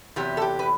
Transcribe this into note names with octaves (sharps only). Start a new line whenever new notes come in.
E2 C3 F#3 G4
A4
G4
B4